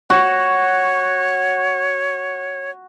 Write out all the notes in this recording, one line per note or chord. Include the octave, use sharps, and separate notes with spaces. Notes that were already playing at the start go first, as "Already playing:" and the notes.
F#4 C#5